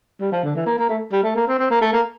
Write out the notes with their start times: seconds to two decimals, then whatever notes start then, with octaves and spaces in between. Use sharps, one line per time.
0.21 G3
0.32 F3
0.43 D3
0.55 E3
0.66 A#3
0.79 A#3
0.89 A3
1.12 G3
1.23 A3
1.36 A#3
1.48 C4
1.58 C4
1.70 A#3
1.81 A3
1.93 A#3